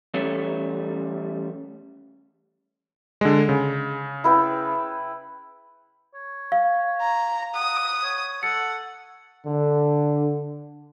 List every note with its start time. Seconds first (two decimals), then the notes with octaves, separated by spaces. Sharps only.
0.14 E3 G3 A3 C#4 A4 C#5
3.21 D3 G#3
3.49 C#3
4.24 E4 B4 G5
6.15 C#5
6.52 F5
7.01 A#5
7.55 F#5 D#6
8.03 C#5
8.43 A4 F#5 C#7
9.46 D3